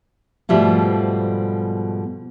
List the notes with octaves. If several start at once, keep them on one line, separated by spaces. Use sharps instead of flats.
G#2 B2 F3 G3 A3